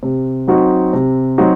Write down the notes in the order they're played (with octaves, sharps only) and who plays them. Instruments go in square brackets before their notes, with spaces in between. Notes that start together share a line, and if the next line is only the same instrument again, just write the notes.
[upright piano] C3
F#3 C4 D#4 F#4
C3
F#3 C4 D#4 F#4